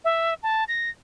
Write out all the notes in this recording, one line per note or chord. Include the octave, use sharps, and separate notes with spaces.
E5
A5
A#6